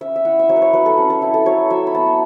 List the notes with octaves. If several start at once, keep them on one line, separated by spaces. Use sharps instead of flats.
C#4 E5
E5
E4 F#5
E5
F#3 C#5
B4
C#5
F#3 B4
A4
C#4
A4
E4
A4
F#3 C#5
F#3 E5
B5
B3 A5